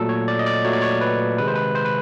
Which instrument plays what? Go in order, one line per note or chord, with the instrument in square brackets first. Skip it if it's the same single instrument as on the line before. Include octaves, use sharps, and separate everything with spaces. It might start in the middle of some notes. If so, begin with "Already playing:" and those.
Already playing: [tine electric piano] A#2 F#3 A3 A4
C#5
D5
D#5
D5
A#2 F#3 A3 C#5
D5
C#5
B4
C3 D#3 G#3 B4
C5
B4
C5
B4